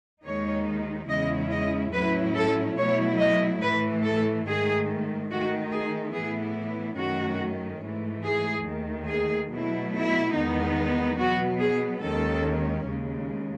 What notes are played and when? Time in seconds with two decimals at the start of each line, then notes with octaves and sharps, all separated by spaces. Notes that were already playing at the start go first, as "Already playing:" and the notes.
0.25 D#2 D#3 G#3 D#4 C#5
1.09 E2 C#3 G#3 C#4 E4 D#5
1.51 D#5
1.94 A2 F#3 C#4 E4 B4
2.35 A4
2.77 B2 F#3 A3 E4 C#5
3.19 D#5
3.62 A2 E3 A3 B4
4.04 A4
4.46 G#2 D#3 A3 G#4
5.30 D#3 A3 D#4 F#4
5.71 G#4
6.14 A2 E3 B3 E4 G#4
6.98 F#2 D#3 A3 C#4 F#4
7.81 G#2 E3 A3
8.24 G#4
8.67 D#2 D#3 A3
9.08 G#4
9.50 B2 F#3 A3 E4
9.93 E4
10.35 E2 D#3 G#3 B3 D#4
11.19 B2 F#3 B3 F#4
11.60 G#4
12.03 D#2 D#3 G#3 C#4 A4
12.87 D#2 C#3 G#3